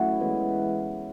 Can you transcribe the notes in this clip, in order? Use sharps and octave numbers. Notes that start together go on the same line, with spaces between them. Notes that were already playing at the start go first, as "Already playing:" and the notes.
Already playing: F#3 A3 C#4 E4 F#4
E3 G#3 B3